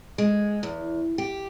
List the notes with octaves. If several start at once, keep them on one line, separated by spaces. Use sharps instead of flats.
G#3
E2
G4